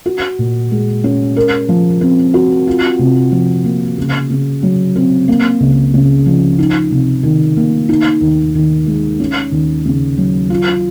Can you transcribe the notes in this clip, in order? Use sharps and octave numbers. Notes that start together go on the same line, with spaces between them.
F#4
A#2
G#3
C#4
A#4
F3
C4
F#4
F4
C3
F3
A#3
C#3
C#3
F#3
C4
A#3
C#2
C#3
F3
D#4
C3
D#3
A#3
D#4
D#2
D#3
G#3
C#4
D#2
C#3
F#3
F4